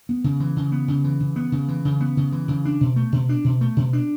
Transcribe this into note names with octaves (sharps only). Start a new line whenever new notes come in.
B3
C#3
E3
C#3
B3
C#3
E3
C#3
B3
C#3
E3
C#3
B3
C#3
E3
C#3
D4
B2
A3
B2
D4
B2
A3
B2
D4